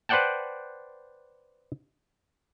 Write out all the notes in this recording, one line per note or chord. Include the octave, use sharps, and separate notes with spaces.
B4 C5 D5 F#5 G5 A5